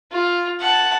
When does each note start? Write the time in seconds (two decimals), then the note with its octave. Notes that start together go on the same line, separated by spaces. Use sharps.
0.12 F4
0.61 F#5 A5